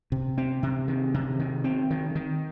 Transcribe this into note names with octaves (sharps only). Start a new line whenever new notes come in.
C3
C4
C3
D#3
C3
D#3
C4
D#3
D#3